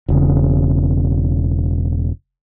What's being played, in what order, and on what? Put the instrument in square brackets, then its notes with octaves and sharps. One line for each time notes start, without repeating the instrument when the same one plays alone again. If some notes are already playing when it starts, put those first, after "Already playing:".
[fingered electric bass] E1 C#3